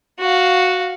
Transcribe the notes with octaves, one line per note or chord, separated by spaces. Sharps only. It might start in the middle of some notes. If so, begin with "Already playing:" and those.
F#4 F5